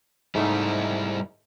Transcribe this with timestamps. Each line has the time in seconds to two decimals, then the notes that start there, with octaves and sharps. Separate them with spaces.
0.35 G#2 G3 A3 D#4 E4